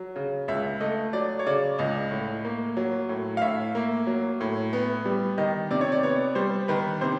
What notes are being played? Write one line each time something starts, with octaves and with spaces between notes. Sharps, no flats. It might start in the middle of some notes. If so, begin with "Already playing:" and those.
Already playing: F#3
C#3
C#2 E5
A3 D#5
F#3 D5
C#5
C#3 D5
C#2 D#5
A2
A#3
F#3
A2
F5
A2 E5
A#3
F#3
A2
B3
G3
D#3 D#5
C3 D5
C#5
D5
B3 C#5
G3 C5
D#3 B4
C3 C5